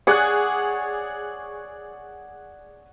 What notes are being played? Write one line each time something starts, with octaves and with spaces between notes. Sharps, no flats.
G#4 C#5 D5 F#5 F#6